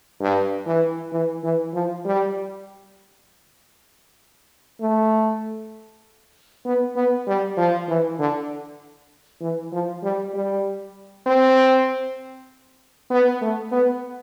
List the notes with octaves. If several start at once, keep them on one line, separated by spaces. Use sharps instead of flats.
G2
E3
E3
E3
F3
G3
A3
B3
B3
G3
F3
E3
D3
E3
F3
G3
G3
C4
B3
A3
B3